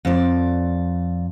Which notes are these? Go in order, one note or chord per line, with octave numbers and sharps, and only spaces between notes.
F2 D5